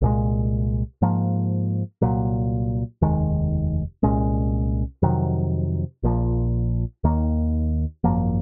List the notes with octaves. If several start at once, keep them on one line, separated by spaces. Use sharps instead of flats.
C2 A#2 G#3
G#2 F3 A#3
C2 A#2 F#3
F1 D#2 D#3 G#3
C2 A#2 G#3 C#4
F2 C3 D#3 F#3
A#1 A#2 F3
D#2 D#3 A#3
G#1 F#2 F3 A#3